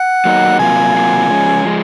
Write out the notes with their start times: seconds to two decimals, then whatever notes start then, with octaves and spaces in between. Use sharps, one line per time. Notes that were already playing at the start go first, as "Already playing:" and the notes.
Already playing: F#5
0.25 F#3 A#3 D#4
0.59 C3 F#3 A#3 F4 G#5
0.94 C3 F#3 A#3 F4
1.29 F3 G#3 C#4
1.65 F3 G#3